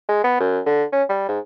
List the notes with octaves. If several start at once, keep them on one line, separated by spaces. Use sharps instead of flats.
G#3
B3
F#2
D3
C#4
G3
G#2